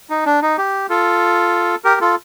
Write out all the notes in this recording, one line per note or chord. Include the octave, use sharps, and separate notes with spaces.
D#4
D4
D#4
G4
F4 A4
G4 A#4
F4 A4